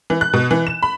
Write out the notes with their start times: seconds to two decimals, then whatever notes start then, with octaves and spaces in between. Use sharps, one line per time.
0.10 E3
0.21 F#6
0.33 B2
0.51 E3
0.67 E7
0.83 B5